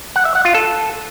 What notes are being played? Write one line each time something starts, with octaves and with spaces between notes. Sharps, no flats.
F#5
E5
F#5
F4
A4